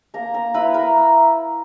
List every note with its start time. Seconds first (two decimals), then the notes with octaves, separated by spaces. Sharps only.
0.14 A#3 A#4 A#5
0.34 A#4 A#5
0.54 E4 B4 B5
0.74 A#4 A#5